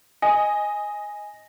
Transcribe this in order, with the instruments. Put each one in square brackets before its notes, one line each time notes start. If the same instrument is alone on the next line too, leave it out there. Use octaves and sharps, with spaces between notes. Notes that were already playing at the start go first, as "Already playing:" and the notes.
[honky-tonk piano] D#5 [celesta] G#5